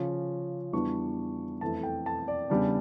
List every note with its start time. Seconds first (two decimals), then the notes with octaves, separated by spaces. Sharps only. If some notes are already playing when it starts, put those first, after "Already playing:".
Already playing: C#3 F3 C#4
0.73 E2 E3 G3 D4 C#6
1.61 F2 E3 A3 A5
1.83 G5
2.06 A5
2.28 D5
2.50 E2 C#3 G3 D4 D5